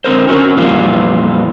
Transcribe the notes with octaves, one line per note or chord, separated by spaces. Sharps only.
D3 C4 A#4 C5
C#4 F#4 A#4
F2 A#2 E3 G3 B3 F4